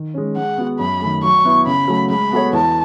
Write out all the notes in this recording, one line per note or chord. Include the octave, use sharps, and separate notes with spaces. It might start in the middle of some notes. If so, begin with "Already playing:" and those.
Already playing: D#3
G#3 C#4
G#3 F#5
B3 F#4
F#2 B5
D#3 A3
F#3 C#6
B3 E4 B4
C#3 B5
F#3 A3
G#3 B5
B3 F#4 A4 C#5
E2 A5